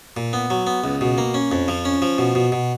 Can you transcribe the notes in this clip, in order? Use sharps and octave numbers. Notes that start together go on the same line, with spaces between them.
A#2
B3
F#3
B3
C#2
B2
A#3
C#4
F2
F3
C#4
F3
B2
B2
B2